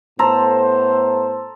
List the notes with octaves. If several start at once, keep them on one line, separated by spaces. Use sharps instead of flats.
A2 B3 A4 C5 A#5 C6